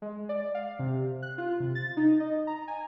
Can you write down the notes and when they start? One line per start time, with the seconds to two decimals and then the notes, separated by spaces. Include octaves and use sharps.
0.02 G#3
0.29 D5
0.55 F5
0.79 C3
1.22 F#6
1.38 F4
1.60 C3
1.75 A6
1.97 D#4
2.20 D#5
2.47 A#5
2.68 G#5